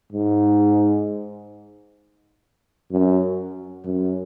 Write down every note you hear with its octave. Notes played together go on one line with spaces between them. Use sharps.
G#2
F#2
F#2